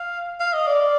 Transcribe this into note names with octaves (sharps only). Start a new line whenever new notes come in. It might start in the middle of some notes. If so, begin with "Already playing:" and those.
Already playing: F5
F5
D#5
D5